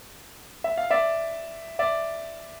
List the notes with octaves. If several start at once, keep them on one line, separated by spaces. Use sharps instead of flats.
E5
F5
D5 E5
D5 E5